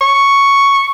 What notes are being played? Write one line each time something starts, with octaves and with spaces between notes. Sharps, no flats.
C#6